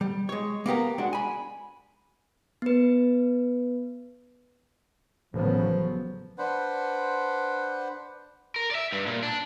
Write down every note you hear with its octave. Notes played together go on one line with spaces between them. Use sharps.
G3
G#3 C#5
A#3 B3 G4 A#4
G#3 D4 F#4
G#5 B5
B3 B4
A1 C#3 F3 F#3 B3
D4 B4 C5 F#5
A#4
D5 E5
G2
A#2
D4